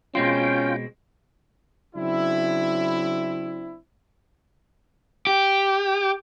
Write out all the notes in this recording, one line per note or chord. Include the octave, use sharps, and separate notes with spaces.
B2 G#3 C4 C#4 F4 G5
C#3 F#3 C4 D4 E4
G4